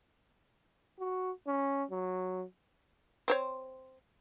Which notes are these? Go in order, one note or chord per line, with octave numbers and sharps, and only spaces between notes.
F#4
C#4
F#3
C4 C5 C#5